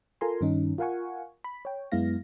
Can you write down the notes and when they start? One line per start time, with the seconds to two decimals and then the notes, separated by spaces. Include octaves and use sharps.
0.21 F4 A4 A#4 G#5 A#5 C6
0.41 G2 D#3 C#4 D#4
0.78 F4 A#4 F5 F#5 G#5 C#6
1.44 B5
1.65 C#5 G5
1.92 F#2 G#3 B3 E4 F5 A#6